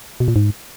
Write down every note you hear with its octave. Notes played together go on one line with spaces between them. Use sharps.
B2
A#2
G#2